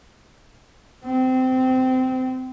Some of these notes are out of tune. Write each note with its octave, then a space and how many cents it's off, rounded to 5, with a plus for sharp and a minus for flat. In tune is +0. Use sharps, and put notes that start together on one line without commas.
C4 -20